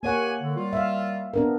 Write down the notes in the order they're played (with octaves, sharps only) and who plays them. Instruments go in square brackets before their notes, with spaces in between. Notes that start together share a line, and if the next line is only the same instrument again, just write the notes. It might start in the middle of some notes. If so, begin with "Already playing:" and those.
[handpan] A#3 C#5 F#5 [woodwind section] G4 G#5
[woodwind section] D3
G3 F4
[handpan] E5 F5
B3 D4 A#4